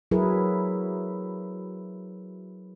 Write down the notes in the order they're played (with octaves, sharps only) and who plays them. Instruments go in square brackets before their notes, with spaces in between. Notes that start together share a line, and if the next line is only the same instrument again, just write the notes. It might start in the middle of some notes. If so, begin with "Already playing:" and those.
[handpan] F#3 E4 G#4 A#4 B4